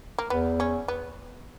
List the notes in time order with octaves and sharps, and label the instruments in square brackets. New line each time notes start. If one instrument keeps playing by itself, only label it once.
[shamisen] A#3
[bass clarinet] E2 [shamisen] B3
[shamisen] C#4
B3